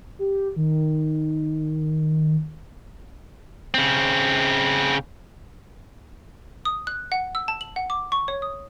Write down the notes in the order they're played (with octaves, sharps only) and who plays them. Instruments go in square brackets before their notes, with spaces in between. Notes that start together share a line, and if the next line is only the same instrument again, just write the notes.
[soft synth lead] G4
D#3
[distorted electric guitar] C#3 C4
[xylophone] D#6
F#6
F#5
E6
A5
F#7
F#5
D6
C#6
C#5
D#6